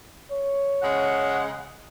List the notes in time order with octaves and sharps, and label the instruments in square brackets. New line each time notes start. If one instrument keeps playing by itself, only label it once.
[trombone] C#5
[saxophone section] C#3 G#3 F#5